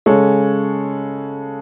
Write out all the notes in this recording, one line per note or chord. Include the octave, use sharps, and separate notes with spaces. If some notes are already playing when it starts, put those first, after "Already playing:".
C#3 G#3 A4 C#5